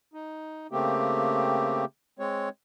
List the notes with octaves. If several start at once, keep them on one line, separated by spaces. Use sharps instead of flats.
D#4
C#3 A3 A#3 C4 G4
G#3 C4 C#5